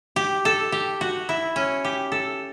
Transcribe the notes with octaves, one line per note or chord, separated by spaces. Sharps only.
G4
A4
G4
F#4
E4
C#4
G4
A4